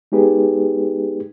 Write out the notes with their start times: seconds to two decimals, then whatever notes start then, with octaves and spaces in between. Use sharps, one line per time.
0.12 G#3 B3 D#4 G4 G#4 B4